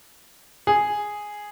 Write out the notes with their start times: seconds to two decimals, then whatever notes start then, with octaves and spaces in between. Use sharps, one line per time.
0.67 G#4